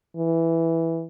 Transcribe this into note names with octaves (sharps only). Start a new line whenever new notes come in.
E3